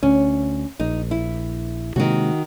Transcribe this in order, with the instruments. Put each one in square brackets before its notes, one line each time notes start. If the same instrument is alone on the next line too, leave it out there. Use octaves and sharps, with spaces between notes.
[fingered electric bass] D2 [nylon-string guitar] C#4
[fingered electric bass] A#1 [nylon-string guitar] D#4
[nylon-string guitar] E4
[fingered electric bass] C3 G#3 A#3 [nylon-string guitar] D#3 F#4